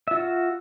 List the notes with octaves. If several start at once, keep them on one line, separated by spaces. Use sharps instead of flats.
F4 F#4 E5